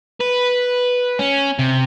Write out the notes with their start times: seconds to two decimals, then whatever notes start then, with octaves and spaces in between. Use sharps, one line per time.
0.20 B4
1.19 C#4
1.59 C3